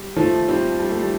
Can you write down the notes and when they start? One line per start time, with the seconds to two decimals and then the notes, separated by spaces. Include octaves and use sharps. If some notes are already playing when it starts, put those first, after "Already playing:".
Already playing: G3
0.16 F3 A3
0.48 G3 C4
0.80 G3
0.90 A3
1.00 G3